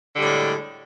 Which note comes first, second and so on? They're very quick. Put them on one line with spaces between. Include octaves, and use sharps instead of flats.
D3 G3 A2 G#3